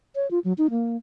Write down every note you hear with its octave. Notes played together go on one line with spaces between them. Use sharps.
C#5
F4
F#3
D#4
A#3